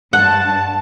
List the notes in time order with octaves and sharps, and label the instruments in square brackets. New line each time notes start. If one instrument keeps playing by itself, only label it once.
[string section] G2 A5 [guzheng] F#5